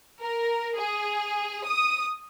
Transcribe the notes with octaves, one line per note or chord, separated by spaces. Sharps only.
A#4
G#4
D#6